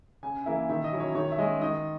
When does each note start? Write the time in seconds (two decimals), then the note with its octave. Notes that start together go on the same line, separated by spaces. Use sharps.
0.23 C#3 G#5
0.46 E3 A#3 E4 E5
0.69 D#3 E5
0.84 D#5
0.92 F#3 C#4 E4
1.00 C#5
1.15 D#3 C#5
1.32 E5
1.38 G#3 C#4 D#5
1.61 D#3 D#5